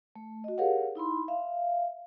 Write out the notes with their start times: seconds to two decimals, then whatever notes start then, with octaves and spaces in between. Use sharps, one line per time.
0.16 A3
0.44 F#4 D#5
0.58 G4 G#4 A#4 C#5 F5 F#5
0.95 D#4 E4 B5 C6
1.28 E5 F5